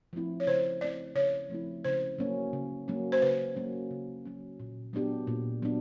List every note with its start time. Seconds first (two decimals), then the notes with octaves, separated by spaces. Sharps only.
0.13 F3 A3 C4 E4
0.40 C#5
0.47 C#3 C5
0.81 F3 A3 C4 E4 D5
1.15 C#3 C#5
1.50 F3 A3 C4 E4
1.84 C#3 C5
2.18 F#3 A#3 C#4
2.53 C#3
2.88 F#3 A#3 C#4
3.12 C5
3.22 C#3 B4
3.56 F#3 A#3 C#4
3.91 C#3
4.25 F#3 A#3 C#4
4.60 A#2
4.93 F#3 B3 D4 G4
5.27 A#2
5.62 F#3 B3 D4